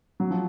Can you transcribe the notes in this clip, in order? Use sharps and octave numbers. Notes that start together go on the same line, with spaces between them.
F#3
F3